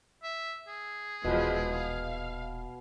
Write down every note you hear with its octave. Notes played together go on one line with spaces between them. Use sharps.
E5
G#4
D#1 B2 E3 F3 G#3
F5